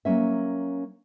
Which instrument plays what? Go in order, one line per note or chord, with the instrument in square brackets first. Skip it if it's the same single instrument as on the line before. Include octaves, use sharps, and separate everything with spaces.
[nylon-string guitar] F#3 A#3 C#4 E5